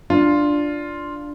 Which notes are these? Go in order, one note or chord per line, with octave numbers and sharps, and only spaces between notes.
D4 F4